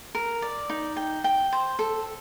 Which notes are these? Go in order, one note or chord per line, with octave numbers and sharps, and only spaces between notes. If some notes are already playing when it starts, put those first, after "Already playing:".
A#4
D5
D#4
G5
G5
C5
A4